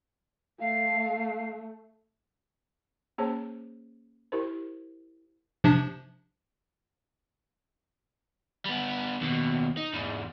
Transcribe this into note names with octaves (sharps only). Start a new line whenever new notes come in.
A3 F5
A#3 C#4 G#4 C5 C#5 A5
E4 G4 A#4 C5
C3 F3 D4
G3 B3
D#2 B2
D#4
E2 G#2